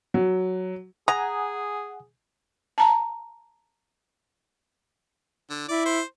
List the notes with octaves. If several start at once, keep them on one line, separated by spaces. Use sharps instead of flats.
F#3
G#4 F#5 G#5 A#5 D#6
A5 A#5
D3
E4 D5
C5